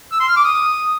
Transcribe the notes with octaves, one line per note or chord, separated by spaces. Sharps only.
E6
C6
F6
D6
D#6